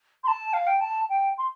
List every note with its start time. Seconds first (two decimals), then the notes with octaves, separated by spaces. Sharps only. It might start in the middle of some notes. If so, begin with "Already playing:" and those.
0.24 C6
0.27 A5
0.53 F5
0.67 G5
0.81 A5
1.09 G5
1.38 C6